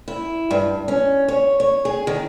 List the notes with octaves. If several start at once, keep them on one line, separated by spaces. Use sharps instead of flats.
E4
G2
C#4
C#5
C#5
G#4
D#3